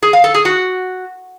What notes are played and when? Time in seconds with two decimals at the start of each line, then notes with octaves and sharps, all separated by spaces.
0.03 G#4
0.13 F5
0.24 A4
0.34 G#4
0.45 F#4